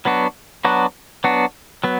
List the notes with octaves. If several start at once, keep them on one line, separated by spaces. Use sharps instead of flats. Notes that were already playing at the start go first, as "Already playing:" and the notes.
F#3 B3 D4 F#4
F#3 B3 D4 F#4
F#3 B3 D4 F#4
F#3 B3